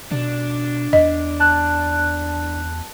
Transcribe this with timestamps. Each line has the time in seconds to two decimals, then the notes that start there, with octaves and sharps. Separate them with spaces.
0.11 B2 D4
0.93 E2 D#5
1.40 A5 F#6